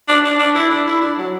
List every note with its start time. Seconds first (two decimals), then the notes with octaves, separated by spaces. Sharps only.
0.08 D4
0.25 D4
0.39 D4
0.55 E4
0.71 D4
0.87 E4
1.02 D4
1.18 F#3